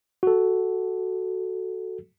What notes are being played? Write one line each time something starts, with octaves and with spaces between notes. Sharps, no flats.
F#4 A4